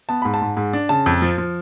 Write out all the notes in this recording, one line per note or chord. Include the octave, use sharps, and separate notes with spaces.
B3 A5
G#2 B5
A5
G#2
G#2
D4
C#3 A5
F2
F3
F3